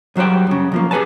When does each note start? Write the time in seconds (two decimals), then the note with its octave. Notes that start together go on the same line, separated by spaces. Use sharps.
0.16 G2 F#3 G3 C5 G5
0.47 F#2 C#3
0.72 B1 F3 A#3
0.91 G4 G#4 B4 G#5 A5